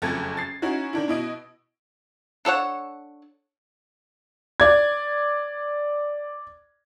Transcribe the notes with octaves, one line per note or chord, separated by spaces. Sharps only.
F#1 F2 A3 G#6 A6
A6 C7
C#4 D#4 E4 F#4
D#3 D4 E4
B2 E4 D#5 D7
D4 A4 C#5 F#5
D5 G#6